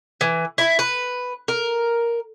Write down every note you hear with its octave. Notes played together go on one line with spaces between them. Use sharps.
E3
E4
B4
A#4